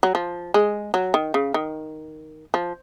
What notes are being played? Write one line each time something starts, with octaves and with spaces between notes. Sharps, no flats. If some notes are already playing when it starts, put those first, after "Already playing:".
F#3
F3
G#3
F#3
D#3
C#3
D#3
F3